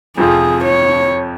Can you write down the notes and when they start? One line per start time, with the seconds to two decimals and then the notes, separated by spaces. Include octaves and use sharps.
0.18 F2 C3 F3 C4 F4 G#4
0.64 C#5